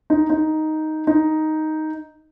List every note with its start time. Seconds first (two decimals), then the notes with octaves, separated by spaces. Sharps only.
0.10 D#4
0.30 D#4
1.07 D#4